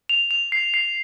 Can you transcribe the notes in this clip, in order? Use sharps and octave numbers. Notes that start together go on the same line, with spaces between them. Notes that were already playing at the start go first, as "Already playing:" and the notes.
F7
F7
C7
C7